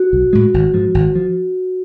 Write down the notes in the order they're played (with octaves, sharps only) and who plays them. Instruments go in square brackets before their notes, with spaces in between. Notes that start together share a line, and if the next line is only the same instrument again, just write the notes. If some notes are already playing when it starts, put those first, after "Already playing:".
Already playing: [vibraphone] F#4
[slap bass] B1
A2 G#3
G#1
G#2 F3
G#1
F3